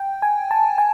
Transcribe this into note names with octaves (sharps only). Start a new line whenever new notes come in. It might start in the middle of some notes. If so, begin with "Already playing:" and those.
Already playing: G5
G#5
A5
G#5